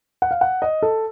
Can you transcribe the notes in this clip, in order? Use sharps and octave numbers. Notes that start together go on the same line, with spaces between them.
F#5
F5
F#5
D#5
A4